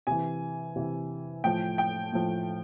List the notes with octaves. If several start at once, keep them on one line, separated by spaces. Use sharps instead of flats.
C3 E3 G#5
C3 E3
A2 F3 G5
G5
A2 F3